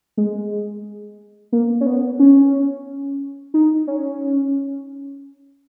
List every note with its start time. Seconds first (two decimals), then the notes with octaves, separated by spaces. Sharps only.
0.17 G#3
1.52 A#3
1.81 C#4
1.86 B3
2.19 C#4
3.54 D#4
3.87 C#4